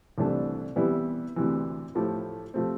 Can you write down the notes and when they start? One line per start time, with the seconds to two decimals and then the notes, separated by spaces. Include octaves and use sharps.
0.18 C2 C3 E3 A3 D4
0.76 C3 E3 G3 B3 E4
1.36 D2 C3 E3
1.95 A2 F3 A3 E4 G4
2.54 C3 F3 A3 C4